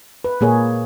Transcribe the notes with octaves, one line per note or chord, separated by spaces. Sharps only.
B4
A#2 A#3 G#4 C#5